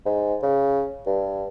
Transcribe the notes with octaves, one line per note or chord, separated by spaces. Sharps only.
G#2
C#3
G2